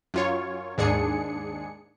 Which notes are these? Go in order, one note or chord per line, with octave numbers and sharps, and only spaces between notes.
F#2 F4 C#5
D#2 G#2 D4 G#4 C#7